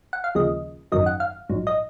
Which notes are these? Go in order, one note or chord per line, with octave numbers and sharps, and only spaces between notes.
F#5
F5
D#2 C#3 F3 G#3 D#5
G#1 F#2 D#3 F#3 D#5
F#5
F5
A#1 G#2 F#3
D#5